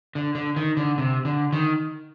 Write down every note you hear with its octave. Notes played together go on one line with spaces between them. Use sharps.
D3
D3
D#3
D3
C3
D3
D#3